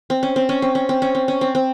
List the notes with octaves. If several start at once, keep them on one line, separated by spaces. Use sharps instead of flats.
C4
C#4
C4
C#4
C4
C#4
C4
C#4
C4
C#4
C4
C4